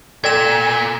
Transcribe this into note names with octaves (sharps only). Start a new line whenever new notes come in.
A#2 A4 D5 G5 G#6 A#6 E7